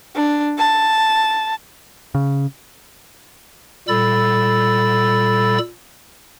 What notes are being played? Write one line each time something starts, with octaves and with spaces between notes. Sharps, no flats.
D4
A5
C#3
A#2 G3 A4 B5 E6 A6